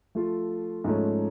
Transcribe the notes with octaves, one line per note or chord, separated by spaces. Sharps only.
F3 A3 F4 A4
G#2 F3 A3 C#4